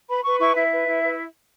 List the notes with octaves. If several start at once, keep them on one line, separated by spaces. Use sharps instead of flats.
B4 B5
B4 C#6
E4 C#6
E4 E5
B4
E4
B4